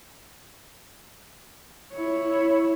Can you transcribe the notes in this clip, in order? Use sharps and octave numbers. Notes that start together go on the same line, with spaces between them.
E4 C#5